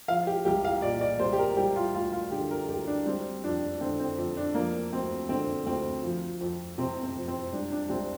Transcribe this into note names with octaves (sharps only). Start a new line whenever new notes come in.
F3 F5
G4
C2 G4
F5
A#2 D5
D5
C2 C5
G4
A#4
G3 G4
F4
D2 F4
F4
D3 G4
A#4
D2 G4
D4
G3 C4
F2 D4
D3 C4
C4
F2
D4
F3 A#3
D2 C4
D3 C4
D2 C4
F3
F2
C3 C4
C4
F2
C4
G3 D4
D4
C2 C4